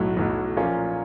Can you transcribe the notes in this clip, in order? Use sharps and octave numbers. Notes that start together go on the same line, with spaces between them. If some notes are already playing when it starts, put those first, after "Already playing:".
Already playing: B1 A2 F#3
B1 A2 F#3
A#2 F3 A#3 C#4 F4